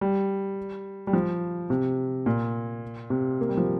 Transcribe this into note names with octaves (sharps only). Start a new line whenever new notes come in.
G3
G3
F3
C3
A#2
C3
A#3
G3
F3